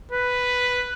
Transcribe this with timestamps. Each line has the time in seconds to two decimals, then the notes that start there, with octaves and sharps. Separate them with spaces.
0.11 B4